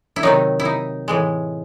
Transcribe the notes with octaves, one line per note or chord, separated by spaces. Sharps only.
E4
C3 D#3 F#3 D#4
E4
D#4
A2 E3 G#3